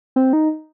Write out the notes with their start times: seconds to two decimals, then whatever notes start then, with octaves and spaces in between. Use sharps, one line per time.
0.16 C4
0.33 D#4